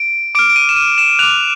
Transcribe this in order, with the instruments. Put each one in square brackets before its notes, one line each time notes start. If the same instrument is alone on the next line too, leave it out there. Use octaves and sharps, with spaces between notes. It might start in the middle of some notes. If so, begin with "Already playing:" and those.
Already playing: [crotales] D7
D6 F6 D7
D7
D#7
E7
D#7
E7
D6 F#6 F7